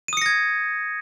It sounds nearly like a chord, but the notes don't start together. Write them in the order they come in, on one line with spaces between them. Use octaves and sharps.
D#7 D#6 C#7 A#6 G#6